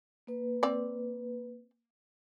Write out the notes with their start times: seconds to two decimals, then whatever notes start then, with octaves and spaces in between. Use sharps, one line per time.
0.27 A#3 B4
0.63 C4 D5